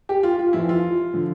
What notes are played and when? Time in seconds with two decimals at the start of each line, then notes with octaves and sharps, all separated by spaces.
0.09 G4
0.23 F4
0.39 F4
0.53 F2 E3 E4
0.69 F4
1.14 D3 F3